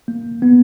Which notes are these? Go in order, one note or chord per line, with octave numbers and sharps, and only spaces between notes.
A#3
B3